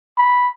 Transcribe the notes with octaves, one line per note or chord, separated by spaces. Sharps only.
B5